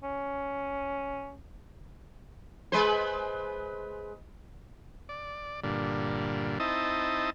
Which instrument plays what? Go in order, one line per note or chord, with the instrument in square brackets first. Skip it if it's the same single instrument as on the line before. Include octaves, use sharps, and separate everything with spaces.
[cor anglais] C#4
[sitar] G#3 B4 C5
[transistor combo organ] D5
G2 A#2 D3
C4 D#4 E4 D#5 A5